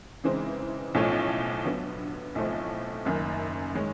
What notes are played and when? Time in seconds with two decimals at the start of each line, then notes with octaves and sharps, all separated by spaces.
0.24 C#3 E3 G#3 C4 D#4
0.94 B1 A2 F3 A3 C#4
1.65 D3 F#3 B3
2.35 B1 A2 F3 A3 C4
3.05 F#1 F#2 D#3
3.75 D#3 G#3 C#4